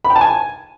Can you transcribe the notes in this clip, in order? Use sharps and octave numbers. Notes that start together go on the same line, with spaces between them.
B5
G5
A5
G#5